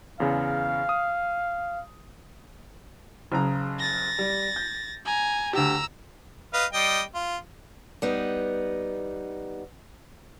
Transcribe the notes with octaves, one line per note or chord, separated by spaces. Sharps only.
E2 C#3 F5
D#6
F#1 C#3 A#5
A6 A#6
G3
G6
G#5 A#5
D2 G4 A#5 E6
B4 D#5 F5
G3 D#5 G5
F4
G3 B3 D#4